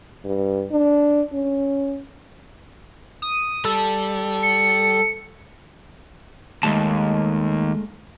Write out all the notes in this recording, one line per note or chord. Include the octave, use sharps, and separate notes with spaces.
G2
D4
C#4
D#6
G3 A4
C#7
D#2 G#3 A3 A5